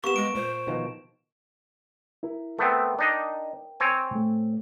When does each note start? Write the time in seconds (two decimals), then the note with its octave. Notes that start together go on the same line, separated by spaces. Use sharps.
0.04 A#3 B3 G4 C#6 E7
0.16 G#3 D7
0.35 A#2 C5
0.67 B2 D#3 F3
2.23 E4 A#4
2.59 A3 B3 C4 A#4 G5
2.99 D4 D#4 D#5
3.80 C4 C#5 G#5
4.11 A2 A3